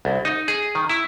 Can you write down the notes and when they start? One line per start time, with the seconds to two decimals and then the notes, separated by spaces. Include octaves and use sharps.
0.05 C2
0.25 D#4
0.48 G#4
0.75 D#3
0.89 E4